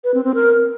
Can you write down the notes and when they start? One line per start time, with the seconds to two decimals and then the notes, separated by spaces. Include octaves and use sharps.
0.04 B4
0.14 C4
0.24 C4
0.35 A#4